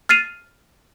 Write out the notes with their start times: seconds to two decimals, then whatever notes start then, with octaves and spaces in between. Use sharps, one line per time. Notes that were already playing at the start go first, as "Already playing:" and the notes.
0.09 F6 A6 C7 D#7 F7